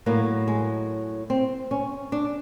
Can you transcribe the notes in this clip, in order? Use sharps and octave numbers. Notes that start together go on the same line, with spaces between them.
A2 F#3 A#3
G#3
C4
C#4
D4